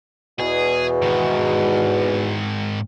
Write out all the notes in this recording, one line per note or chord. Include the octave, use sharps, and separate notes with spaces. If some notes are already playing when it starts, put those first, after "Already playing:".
E2 B2 G#4
G#2 D#3